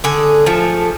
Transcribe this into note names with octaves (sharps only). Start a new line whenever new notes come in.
D3 G#4
F3 A3